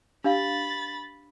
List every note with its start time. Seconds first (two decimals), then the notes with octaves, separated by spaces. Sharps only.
0.24 D4 G4 F5 B5 A6